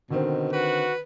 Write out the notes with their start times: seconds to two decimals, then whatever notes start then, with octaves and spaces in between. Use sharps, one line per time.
0.10 B2 D3 D#3 C4
0.53 F#4 B4